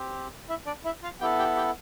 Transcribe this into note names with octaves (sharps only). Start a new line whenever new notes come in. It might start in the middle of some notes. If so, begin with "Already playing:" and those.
Already playing: C4 G4
E4 E5
D4 D5
E4 E5
F4 F5
B3 E4 G4 A4 G5
G4 G5
G4 G5